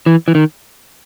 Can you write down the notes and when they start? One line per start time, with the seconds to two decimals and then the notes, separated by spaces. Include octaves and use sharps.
0.06 E3
0.28 E3
0.35 D#3